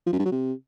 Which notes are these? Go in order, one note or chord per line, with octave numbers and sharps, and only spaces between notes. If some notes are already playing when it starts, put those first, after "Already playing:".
F3
F#2
G2
F#3
C3